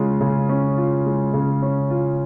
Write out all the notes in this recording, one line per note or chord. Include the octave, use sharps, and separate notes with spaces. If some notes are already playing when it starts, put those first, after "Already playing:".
Already playing: C#3 G#3 C#4 F4
C#3
C#4
F4
G#3
C#3
C#4
F4